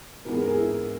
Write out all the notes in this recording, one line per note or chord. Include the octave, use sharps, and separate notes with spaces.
G#2 E3 B3 A#4
G#4
A#4
G#4
E4